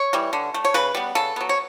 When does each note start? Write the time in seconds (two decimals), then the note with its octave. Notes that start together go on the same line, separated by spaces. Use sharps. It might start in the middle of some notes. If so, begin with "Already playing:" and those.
Already playing: C#5
0.13 E3 G3
0.33 D3
0.54 A3
0.65 C#5
0.74 C#3 B4
0.95 G3 B3
1.15 C#3 A4
1.36 F#3 B3
1.49 C#5